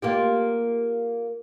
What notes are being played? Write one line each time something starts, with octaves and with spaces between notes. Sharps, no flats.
A#3 F4 G4